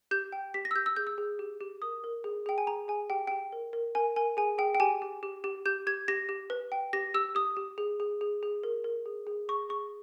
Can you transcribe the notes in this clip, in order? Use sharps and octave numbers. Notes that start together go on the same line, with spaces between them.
G4 G6
G5
G4 B6
A#6
E6
G4 G6
E6
G#4 G6
E6
G#4
G4
G4
A#4 D#6
A#4
G#4
G#4 G5
G#5
G#4 A#5
G#4 G#5
G4 G5
G4 G5
A#4
A#4
A#4 G#5
A#4 G#5
G#4 G#5
G#4 G5
G5
G4 G#5
G4
G4
G4
G4 G6
G4 G#6
G4 A#6
G4
B4
G5
G4 A#6
G4 E6
G4 D#6
G4
G#4
G#4
G#4
G#4
A#4
A#4
G#4
G#4
G#4 C#6
G#4 C#6